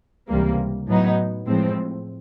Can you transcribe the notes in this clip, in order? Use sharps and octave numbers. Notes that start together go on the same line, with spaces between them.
C#2 C3 E3 G3 A#3
A2 F#3 B3 D#4
A2 F3 G#3 C4